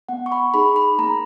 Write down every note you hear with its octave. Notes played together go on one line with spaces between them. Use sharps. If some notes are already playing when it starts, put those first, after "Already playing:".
B3 F#5
C#6
B5
D#4 G#4 B5
B5
A#3 A#5